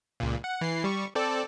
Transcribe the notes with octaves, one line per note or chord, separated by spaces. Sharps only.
C#2 A#2
F#5
E3 C7
G3 C#6
C4 A4 D5